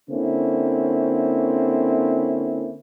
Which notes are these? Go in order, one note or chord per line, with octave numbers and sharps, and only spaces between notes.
D3 A#3 C4 C#4 E4